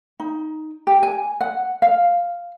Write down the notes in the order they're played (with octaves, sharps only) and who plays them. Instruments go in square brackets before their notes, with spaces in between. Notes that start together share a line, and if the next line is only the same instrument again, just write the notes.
[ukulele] D#4
G4
G#5
F#5
F5